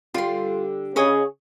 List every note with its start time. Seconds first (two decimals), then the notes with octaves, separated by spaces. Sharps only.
0.14 D3 G3 F4 G4 C6
0.96 C#3 G#4 C#5 D#5 D#6